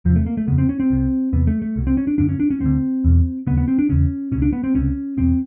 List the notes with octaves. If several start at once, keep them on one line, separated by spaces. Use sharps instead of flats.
E2 C3 F3
A3
A#3
A3
F2 C#3 B3
C4
C#4
C4
C2 C3
E2 C3 B3
A3
A3
C2 B2
C4
C#4
D4
F#2 D3 D4
C#4
D4
C#4
D2 D3 C4
E2 B2
D#2 C#3 B3
B3
C4
D4
E2 C#3 C#4
C#2 B2 C#4
D4
B3
C4
C#2 C3 C#4
E2 B2 C4